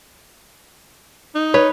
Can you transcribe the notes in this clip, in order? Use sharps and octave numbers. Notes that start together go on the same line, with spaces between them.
D#4
B4 C#5